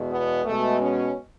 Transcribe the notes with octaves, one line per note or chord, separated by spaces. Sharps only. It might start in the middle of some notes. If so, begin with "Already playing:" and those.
Already playing: E2 B2 G#3
B3
B2 G#3 A3
C#4